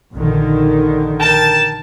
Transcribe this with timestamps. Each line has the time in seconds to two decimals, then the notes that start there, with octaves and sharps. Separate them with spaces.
0.13 A#1 D3 D#3
1.19 A#4 G5 A5